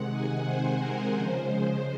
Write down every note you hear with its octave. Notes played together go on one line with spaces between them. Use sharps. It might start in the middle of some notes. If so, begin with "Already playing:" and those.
Already playing: C3 D#3 G#3 F#5
G#5
C5
A#4
C#3 F3 G#3 C5